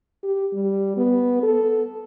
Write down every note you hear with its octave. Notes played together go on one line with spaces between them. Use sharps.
G4
G3
B3
A4